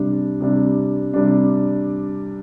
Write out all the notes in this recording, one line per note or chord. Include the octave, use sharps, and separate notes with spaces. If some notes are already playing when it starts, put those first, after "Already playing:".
Already playing: C3 G3 D4
C3 G3 D4
C3 G3 D4